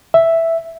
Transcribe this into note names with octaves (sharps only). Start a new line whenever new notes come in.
E5